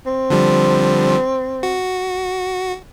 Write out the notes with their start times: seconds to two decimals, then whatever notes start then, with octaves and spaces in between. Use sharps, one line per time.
0.06 C4
0.30 D3 F3 G3
1.63 F#4